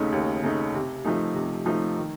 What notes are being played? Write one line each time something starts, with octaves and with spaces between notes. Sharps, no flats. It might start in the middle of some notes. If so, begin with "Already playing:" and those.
Already playing: D#2 C#3 A3 D#4
D#2
C#3 A3 D#4
C3
F3 A3 D#4
C3
F3 A3 D#4
D#3